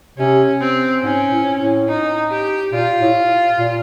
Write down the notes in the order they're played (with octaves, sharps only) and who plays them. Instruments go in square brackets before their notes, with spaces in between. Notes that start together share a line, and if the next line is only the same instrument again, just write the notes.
[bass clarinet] C3 [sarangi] C#4
[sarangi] C4
[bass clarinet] G#2 [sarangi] C#4
[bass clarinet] A2
A2
[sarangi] D#4
G4
[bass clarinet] A#2 [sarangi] F4
[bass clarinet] A2
A#2